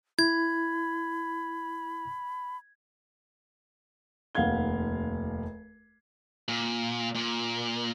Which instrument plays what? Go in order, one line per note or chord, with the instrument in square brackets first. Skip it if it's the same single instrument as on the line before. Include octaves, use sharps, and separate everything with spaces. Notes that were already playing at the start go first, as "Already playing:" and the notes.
[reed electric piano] E4 [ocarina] B5 [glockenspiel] G#6
[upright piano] F1 D#2 F5 F#5 G#6 G7
[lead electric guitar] A#2
A#2